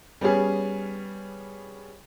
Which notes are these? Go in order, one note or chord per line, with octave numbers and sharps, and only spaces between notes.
G3 B3 C#4 G#4